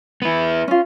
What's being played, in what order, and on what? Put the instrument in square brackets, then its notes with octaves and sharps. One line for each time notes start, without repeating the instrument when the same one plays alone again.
[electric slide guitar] B3 E4
[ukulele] C#4 F4